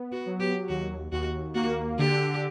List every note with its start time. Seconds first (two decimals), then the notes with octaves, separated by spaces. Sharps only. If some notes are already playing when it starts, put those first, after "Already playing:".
Already playing: B3
0.12 F#4
0.26 F#3
0.40 G4
0.68 D#2 F#4
1.12 D#2 F#4
1.54 A#3 F#4
1.98 D3 G4